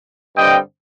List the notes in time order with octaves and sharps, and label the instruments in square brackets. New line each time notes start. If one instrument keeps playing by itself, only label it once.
[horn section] G2 D3 G3 C4 D#5 G5